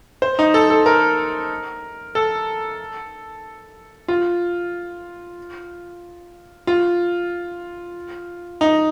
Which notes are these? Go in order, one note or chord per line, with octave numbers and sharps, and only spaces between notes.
C5
D#4
A4
A4
A#4
A4
F4
F4
D#4